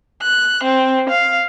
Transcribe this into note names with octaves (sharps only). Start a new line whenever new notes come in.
F#6
C4
F5